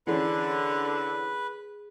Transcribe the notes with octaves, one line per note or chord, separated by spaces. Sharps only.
D3 E3 C#4 G#4 B4